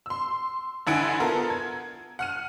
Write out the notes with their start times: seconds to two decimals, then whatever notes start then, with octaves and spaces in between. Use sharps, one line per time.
0.06 C6 E6
0.87 A1 D3 E4 F#5 G#5 D7
1.20 B3 F4 A4 A#4
1.50 G#6
2.19 F#5 F6 D#7